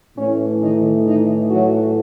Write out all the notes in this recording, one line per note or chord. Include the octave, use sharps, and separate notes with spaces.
A2 E3 A3 C#4
D#3 D#4
D#3 D#4
F#3 F#4